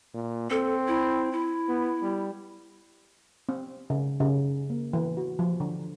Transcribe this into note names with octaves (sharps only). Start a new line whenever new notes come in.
A#2
C4 A4
E4
E4
B3
G3
C4
C#3
C#3
A#3
E3
F#4
F3
D3